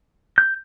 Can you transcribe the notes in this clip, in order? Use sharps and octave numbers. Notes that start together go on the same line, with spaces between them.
G6